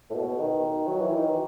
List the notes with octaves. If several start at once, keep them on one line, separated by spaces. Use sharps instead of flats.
A2
B2
D#3
F#3
E3
D#3